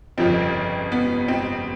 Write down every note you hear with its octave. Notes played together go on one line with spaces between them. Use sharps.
G1 F2 C#3 F3 C4
B3
C4